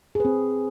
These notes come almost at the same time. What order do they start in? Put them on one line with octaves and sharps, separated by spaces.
G#4 B4 C4